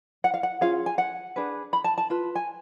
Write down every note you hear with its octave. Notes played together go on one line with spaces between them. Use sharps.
F#5
F5
F#5
C#4 F4 G#4 F5
G#5
F#5
D4 G#4 B4
B5
A5
A5
F4 B4
G#5